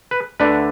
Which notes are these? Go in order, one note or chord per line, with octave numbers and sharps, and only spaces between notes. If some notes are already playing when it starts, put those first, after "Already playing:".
B4
D2 D3 A3 D4 B4